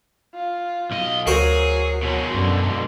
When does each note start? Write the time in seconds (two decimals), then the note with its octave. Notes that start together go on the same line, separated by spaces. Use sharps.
0.35 F4
0.91 B1 D#5
1.27 D2 F#3 F#4 G#4 A#4 C5
2.02 B2 F#3 G#3
2.35 F#2 D3